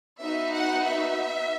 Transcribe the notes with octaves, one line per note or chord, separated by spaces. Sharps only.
B3 D#4 F#4 E5
F#5
E5